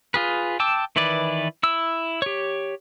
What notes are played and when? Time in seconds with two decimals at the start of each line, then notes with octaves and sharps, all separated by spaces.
0.14 F4 G#4 B4
0.60 G5 A5 D6 E6
0.96 D#3 E3 E4 B4 D5
1.63 E4 E6
2.22 G4 C#5